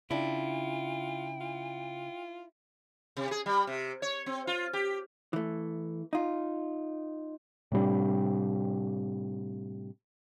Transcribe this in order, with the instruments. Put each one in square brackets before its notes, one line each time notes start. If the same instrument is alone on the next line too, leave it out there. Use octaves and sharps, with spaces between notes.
[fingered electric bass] C#3 [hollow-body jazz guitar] D4 E4 [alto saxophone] F4 [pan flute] G5
[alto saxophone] F4
[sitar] C3
G#4
G3
C3
C#5
C4
F4
G4
[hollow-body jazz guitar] E3 A3
D#4 F4
[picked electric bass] A2 C3 G3 D4